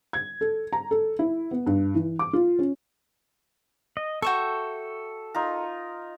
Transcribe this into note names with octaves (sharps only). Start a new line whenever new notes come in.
G#6
A4
A#5
A4
E4
B3
G2
E3
D6
F4
C#4
D#5
F#4 A4 E5 G5 C#6
D#4 F4 A#4